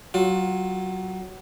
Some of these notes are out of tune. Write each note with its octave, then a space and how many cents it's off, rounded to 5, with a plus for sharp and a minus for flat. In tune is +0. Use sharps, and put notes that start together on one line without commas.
F#3 +20 F4 +35